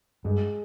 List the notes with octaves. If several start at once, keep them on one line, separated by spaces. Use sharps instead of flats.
G2 G#3